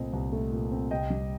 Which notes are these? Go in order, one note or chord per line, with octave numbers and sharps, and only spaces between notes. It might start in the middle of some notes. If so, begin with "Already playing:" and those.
Already playing: C2 A#2 A3 C4 C5 D#5
C2
A3
A#2
C4
C2 D#5 G5
G3